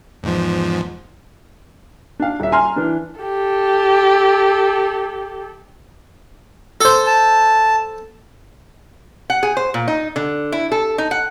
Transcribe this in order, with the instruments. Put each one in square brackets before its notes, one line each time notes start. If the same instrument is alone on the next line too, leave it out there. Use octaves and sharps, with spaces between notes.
[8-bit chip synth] E2 G#2 F3
[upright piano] D4 F5
D#1 E5
G#5 A#5 C6 F6
E3 D4
[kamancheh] G4 A4
[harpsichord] A4 C5
[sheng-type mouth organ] A5
[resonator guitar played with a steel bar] F#5
G#4
C5
A#2
D#4
D3
E4
A4
D#4
F#5